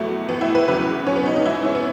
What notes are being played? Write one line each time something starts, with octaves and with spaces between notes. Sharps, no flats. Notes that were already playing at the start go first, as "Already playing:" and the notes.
Already playing: E2 B2 F#3 A3
A2 E3 B3
E4
B4
E2 C#3 F#3 B4
E2 B2 F#3 C#4
B3
D#4
D#4
G#2 E3 E4
E4
C#4
B3